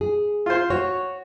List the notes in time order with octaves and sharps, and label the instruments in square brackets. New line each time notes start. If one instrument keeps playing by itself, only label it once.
[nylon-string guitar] G#4
[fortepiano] F4 C5
[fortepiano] F#4 [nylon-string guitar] C#5